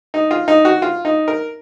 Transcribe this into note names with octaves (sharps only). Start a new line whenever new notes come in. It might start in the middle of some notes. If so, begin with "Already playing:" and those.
D#4
F4
D#4
F#4
F4
D#4
A#4